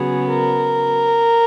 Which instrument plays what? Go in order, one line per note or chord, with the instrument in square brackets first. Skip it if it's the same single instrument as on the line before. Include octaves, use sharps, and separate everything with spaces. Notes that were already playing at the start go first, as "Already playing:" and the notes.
Already playing: [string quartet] C#3 F#3 B3 G#4
A#4